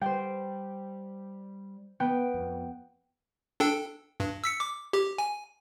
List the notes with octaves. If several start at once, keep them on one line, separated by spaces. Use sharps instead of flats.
G3 C5 G5
B3 G5
F2
D4 A4 G5
G2
E6 B6 C#7
D6
G4
G#5